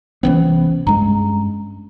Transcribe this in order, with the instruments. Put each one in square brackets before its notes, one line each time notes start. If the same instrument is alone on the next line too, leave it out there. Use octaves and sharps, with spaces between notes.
[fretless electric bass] C2 E3 B3 [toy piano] C#4 C5
[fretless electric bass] G2 G#3 [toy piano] A#5